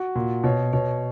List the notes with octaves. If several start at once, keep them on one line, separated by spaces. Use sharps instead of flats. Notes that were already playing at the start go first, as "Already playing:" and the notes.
Already playing: F#4
A#2
B2 C#5
B2 C#5